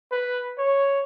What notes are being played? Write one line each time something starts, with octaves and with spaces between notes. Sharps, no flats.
B4
C#5